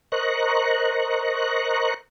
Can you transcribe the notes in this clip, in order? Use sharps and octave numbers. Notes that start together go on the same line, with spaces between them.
A#4 C5 D#5 A#5 C#6 F#6